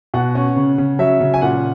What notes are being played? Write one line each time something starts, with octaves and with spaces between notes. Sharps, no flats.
B2 F#5
C#4
C#3
C#3
F#3 E5
C#3
G#5
A#2 F#5